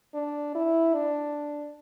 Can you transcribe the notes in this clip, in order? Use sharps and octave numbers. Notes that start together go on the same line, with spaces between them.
D4
E4
D4